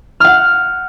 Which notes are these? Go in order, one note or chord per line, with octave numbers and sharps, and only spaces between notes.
F#5 F6